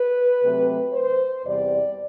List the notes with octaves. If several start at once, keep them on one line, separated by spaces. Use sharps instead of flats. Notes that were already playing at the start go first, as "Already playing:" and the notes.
Already playing: B4
C3 F#3 A3 C4
C5
E2 C3 G3 D5